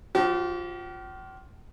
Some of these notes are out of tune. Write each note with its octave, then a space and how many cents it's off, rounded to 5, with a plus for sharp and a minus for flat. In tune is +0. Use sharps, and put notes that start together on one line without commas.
F3 +10 G4 -45